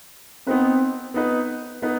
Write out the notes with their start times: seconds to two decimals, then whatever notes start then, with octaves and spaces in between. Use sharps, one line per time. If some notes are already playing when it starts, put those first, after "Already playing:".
0.47 B3 C4 D#4 B4
1.14 B3 D#4 B4
1.82 B3 D#4 B4